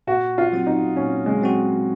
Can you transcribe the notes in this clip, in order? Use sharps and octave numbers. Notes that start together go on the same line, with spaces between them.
A#2 F#4
F4
F#3 C4 F#4
D#4
A#2 C#4
G#3
F#3 C4 F#4